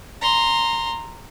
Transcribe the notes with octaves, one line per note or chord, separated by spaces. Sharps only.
A#5 C6